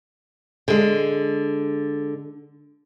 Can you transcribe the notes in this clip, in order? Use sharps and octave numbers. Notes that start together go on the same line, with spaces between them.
D3 G#3